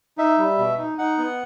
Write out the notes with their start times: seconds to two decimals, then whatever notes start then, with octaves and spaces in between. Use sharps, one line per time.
0.18 D#4 E5
0.38 G3
0.58 B2
0.78 D#4
0.98 D#4 F#5
1.18 B3